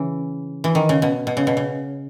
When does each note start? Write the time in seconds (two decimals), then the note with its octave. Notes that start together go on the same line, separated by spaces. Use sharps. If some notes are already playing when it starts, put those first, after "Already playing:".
Already playing: C#3 E3
0.64 E3
0.75 D#3
0.89 C#3
1.02 B2
1.27 B2
1.37 C#3
1.47 B2
1.57 C#3